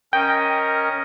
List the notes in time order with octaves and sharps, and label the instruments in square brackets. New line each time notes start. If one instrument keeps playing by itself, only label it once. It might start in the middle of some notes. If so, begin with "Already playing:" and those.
[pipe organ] C#4 A#4 D#5 [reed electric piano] G5